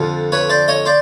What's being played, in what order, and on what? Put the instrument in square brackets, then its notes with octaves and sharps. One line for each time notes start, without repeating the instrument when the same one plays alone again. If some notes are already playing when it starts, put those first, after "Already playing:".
Already playing: [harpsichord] F2 D3 F3
B4 C#5
C5 D5
C#5 D#5
C5 D5